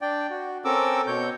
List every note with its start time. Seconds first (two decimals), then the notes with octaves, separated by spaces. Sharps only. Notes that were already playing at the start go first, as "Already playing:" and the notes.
0.01 D4 D5 G5
0.30 F#4
0.65 C4 C#4 A4 A#4 D6 E6
1.07 B2 C#5 G6